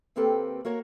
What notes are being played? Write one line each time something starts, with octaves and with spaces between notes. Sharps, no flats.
D#2 A#3 C4 G4 A4 B4
A#3 F#4 A#4 C#5 F#5